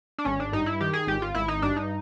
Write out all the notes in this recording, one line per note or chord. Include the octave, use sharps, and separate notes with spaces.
D4
G#1 C#4
D4
G2 D#4
E4
D#3 G4
G#4
G#1 G4
F4
G#1 E4
D#4
G2 D4
D#4